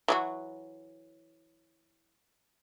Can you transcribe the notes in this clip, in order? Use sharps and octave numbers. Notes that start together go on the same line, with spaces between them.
E3 F#3 F#4